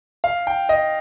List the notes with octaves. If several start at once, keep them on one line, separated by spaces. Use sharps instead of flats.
F5
G5
D#5